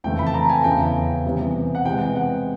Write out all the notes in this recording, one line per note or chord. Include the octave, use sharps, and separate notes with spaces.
F2 C#3 E3 A3 G5
B5
A5
A#5
G#5
E2 C#3 E3 G5
C3 E3 G3 B3
F#5
C3 E3 G#3 B3 G5
F#5